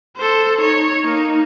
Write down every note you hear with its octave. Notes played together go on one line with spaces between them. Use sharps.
A4 C5
D#4 C#5
A#3 D#4